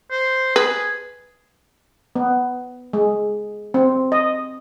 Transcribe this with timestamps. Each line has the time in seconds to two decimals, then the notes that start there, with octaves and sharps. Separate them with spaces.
0.11 C5
0.56 G#4 B4
2.16 B3
2.93 G#3
3.74 C4
4.12 D#5